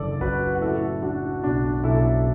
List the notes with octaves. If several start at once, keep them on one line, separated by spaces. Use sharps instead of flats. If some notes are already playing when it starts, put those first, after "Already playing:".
Already playing: F#1 F#2 D3 A4 D5
F#1 F#4 B4
F#4
A2 E4 A4
F#3 D4 F#4
B1 D4 F#4
B1 E4 A4